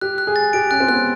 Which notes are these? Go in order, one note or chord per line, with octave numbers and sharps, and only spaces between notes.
G4 F#6
F#6
G#4
A6
G4 D7
C#4 F#6
C4
B3 F#6